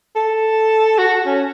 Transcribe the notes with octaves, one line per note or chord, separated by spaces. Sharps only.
A4
F#4
C#4